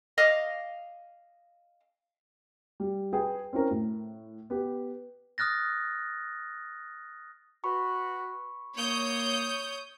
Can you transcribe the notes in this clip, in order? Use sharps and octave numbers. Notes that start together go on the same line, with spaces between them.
D#5 F5 D6
G3
G#4 B4 G5
C4 C#4 E4 A#4
A2
B3 G4
D#6 F6 F#6 A6 A#6
F#4 B4 B5 C#6
A#3 C#5 D#6 G6